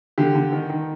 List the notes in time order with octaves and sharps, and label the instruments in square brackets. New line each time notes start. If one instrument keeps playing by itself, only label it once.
[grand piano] D3 G4
D3
D#3
D#3